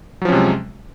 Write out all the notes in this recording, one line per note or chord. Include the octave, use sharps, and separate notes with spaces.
C3 F3 F#3 G#3 C#4